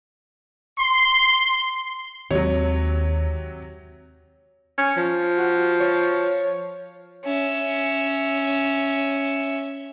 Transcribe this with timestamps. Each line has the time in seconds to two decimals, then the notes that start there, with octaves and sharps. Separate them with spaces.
0.78 C6
2.30 D#2 C3 D#3 F#3 G#3 C#5
4.78 C#4
4.97 F3
5.38 F#4
5.81 C#5
7.25 C#4 E5